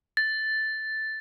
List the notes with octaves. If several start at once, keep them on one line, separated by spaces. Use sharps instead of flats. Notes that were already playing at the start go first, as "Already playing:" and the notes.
A6